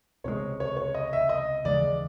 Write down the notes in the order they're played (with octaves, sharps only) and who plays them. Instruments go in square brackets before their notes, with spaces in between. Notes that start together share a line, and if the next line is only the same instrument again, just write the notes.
[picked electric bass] C#2 C3 D#3 G#3 [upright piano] C#5
[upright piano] C#5
C#5
D#5
E5
D#5
[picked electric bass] D#2 C#3 E3 G#3 [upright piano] D5